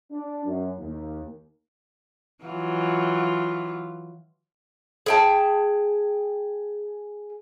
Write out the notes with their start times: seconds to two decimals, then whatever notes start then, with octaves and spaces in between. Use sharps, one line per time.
0.11 D4
0.45 F#2
0.78 D#2
2.44 E3 F#3 F4
5.06 G#4 G5 A5